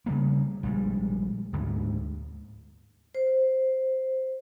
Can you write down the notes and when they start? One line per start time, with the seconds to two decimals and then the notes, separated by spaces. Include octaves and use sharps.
0.06 C#3 G3 A#3
0.63 A#1 G3 G#3
1.53 D2 G#2 D3
3.15 C5